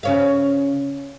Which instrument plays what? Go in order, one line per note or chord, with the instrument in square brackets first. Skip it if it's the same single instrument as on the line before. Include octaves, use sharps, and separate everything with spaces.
[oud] C#3 C#5 F5